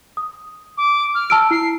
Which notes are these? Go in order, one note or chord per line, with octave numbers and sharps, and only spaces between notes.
D#6
D6
F6
A5 E6 D7
E4 C7